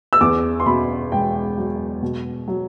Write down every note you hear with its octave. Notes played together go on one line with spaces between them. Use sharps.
E6
E2 D6
C6
B2 B5
E1 G5
F#3
B2
F#3